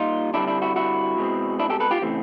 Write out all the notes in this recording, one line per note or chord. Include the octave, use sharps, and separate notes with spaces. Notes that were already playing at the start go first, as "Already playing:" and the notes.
Already playing: A#2 G3 A#3 D#4 F4
D3 G3 C4 D4 E4
D4 E4
E4 F#4
E4 F#4
B2 G#3 C4
D4 E4
G4 A4
A4 B4
F4 G4
C#3 E3 A3 C4